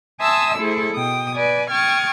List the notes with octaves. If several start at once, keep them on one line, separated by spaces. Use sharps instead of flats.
E5 G#5 A5 C6 D#6 E6
A3 E4 G#4 A4 C5
B2 G5 D#6
B4 D5 G#5
G5 C#6 D#6 F6 G#6 A6